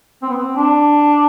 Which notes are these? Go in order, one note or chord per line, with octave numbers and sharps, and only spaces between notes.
C4
B3
C4
D4